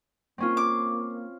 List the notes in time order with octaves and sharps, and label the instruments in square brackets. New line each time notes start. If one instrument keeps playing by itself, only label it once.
[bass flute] A#3 [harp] C4 C#4 F4
[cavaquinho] D6